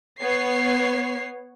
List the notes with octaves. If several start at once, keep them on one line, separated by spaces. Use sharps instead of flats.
B3 C#5 C7